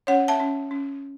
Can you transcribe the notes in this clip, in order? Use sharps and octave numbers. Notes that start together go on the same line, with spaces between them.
C#4 C#5 F#5
E5 A5
C#4
C#4